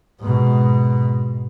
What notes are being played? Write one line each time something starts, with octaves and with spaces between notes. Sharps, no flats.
G#2 B2